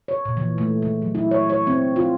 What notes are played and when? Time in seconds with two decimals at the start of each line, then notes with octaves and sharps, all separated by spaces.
0.08 C#5
0.25 A#2
0.37 E3
0.58 A3
0.82 G#3
1.02 F#3
1.15 E4
1.31 C#5
1.50 C#5
1.67 C4
1.96 F4